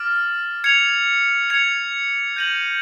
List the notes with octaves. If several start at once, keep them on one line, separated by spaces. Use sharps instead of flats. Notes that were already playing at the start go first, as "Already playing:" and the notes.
Already playing: D6 F6 A6 D7 F#7
G#6 C#7 F7
G#6 C#7 F7
G6 A#6 D#7 F#7